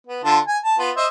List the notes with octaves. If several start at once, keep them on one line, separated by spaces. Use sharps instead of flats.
B3
D3 F4 A5
G#5
A5
B3 F4
C5 D#5 E5